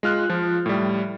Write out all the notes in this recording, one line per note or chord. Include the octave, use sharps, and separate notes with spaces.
G#3 F4 F6 F#6
F3
A2 G3